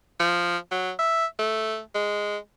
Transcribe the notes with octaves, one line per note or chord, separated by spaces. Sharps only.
F3
F#3
E5
A3
G#3